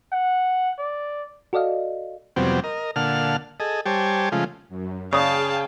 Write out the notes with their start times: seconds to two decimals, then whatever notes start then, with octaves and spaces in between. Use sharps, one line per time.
0.12 F#5
0.79 D5
1.53 F#4 A4 D5 D#5 F5
2.36 F2 C3 F#3 G3 B3 C4
2.64 A#4 D#5
2.96 A#2 D3 F5 F#5 A5 F6
3.60 G#4 A4 D#5
3.86 G3 G4 C5 C#5 G#5 A5
4.32 C#3 F3 G#3 A3 F4
4.69 F#2
5.13 C#3 G#4 D5 F5 G5 A5 D#6